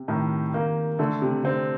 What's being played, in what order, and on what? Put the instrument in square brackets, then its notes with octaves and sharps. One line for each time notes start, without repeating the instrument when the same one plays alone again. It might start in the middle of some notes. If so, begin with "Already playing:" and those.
Already playing: [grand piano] C3
[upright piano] A2 [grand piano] D#3
[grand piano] D#3 [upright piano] A#3
[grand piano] D3 [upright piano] A3
[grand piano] C3
[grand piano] D3 [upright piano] C4